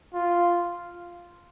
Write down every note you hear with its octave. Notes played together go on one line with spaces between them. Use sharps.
F4